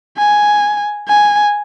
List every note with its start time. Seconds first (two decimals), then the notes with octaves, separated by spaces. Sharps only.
0.18 G#5
1.08 G#5